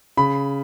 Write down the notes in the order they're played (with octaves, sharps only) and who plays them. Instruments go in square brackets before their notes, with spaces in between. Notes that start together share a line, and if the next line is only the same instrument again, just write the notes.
[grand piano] C#3 B5